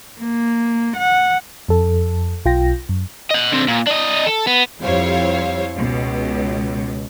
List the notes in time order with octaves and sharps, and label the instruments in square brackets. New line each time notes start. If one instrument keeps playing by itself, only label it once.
[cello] A#3
F#5
[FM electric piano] F2 A4
B1 F4 G5 A#6
F#2
[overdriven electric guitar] D#5 F#5
D3 C4
A#2
D4 D#5
A4
B3
[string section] F2 G3 E4 C5 C#5 F5
C#2 B2